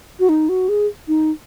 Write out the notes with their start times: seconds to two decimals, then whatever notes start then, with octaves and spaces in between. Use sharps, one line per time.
0.20 F#4
0.29 D#4
0.49 F#4
0.69 G#4
1.08 D#4